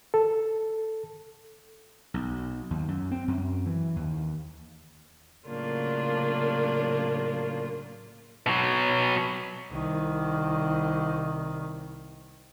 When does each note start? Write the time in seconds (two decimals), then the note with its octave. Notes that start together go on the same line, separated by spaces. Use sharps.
0.14 A4
2.14 B1
2.71 D#2
2.88 F#2
3.11 C4
3.28 F#2
3.66 E3
3.96 D#2
5.48 A2 C#3 F#3 A#3 D4 F4
8.46 B2 F#3
9.72 C2 D#3